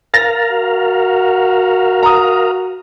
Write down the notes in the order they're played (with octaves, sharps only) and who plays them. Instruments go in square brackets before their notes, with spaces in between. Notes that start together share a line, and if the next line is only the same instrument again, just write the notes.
[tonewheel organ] A#4 F5 [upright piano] A6 A#6
[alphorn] F#4
[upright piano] A#5 D#6